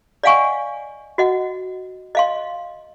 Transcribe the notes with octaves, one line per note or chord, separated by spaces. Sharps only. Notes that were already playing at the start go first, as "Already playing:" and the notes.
D5 D#5 F5 F#5 G#5 C#6
F#4 D#5 F#5
D#5 F5 C6